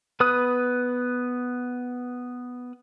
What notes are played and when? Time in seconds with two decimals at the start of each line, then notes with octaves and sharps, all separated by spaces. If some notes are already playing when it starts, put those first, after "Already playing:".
0.20 B3 B4 B5 D#6 F#6